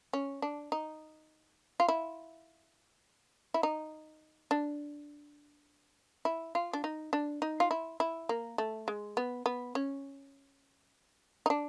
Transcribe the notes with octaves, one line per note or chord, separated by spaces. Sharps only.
C#4
D4
D#4
F4
E4
E4
D#4
D4
E4
F4
D4
D#4
D4
D#4
F4
E4
E4
A#3
A3
G#3
B3
B3
C#4
D#4
D4